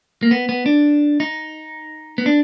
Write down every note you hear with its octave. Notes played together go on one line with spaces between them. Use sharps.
A#3
B3
B3
D4
D#4
B3
D4